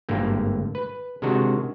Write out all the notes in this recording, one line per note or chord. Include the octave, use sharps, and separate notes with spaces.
G#1 G2 D3 A3 A#3
B4
C3 D#3 G#3 D4 F#4